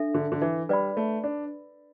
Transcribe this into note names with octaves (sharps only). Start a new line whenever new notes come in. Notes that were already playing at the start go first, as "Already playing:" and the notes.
Already playing: D4 A4 E5
D3
D3
E3
G3 B4 D5 B5
A3
D4